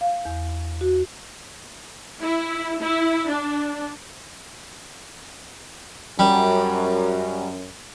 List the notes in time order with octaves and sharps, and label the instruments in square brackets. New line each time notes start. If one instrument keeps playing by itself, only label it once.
[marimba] F5
E2
F#4
[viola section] E4
E4
D4
[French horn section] F#2 [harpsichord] G3